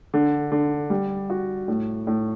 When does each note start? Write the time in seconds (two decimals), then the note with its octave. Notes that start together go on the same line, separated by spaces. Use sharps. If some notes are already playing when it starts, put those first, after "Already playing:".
0.14 D3
0.52 D3
0.90 G3
1.30 F#4
1.68 A2
2.07 A2